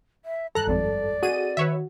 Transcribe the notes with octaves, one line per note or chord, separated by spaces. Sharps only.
E5
G2 F#3 A4 A5 A#5 F#6
G#1 F2 D5
C4 F#4 G#4 A4 D#5 D#7
D#3 B4 C#5 E5